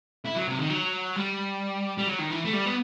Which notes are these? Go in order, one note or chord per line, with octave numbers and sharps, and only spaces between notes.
E4
F#3
C3
D#3
F#3
G3
G3
F#3
D#3
E3
A3
G3
B3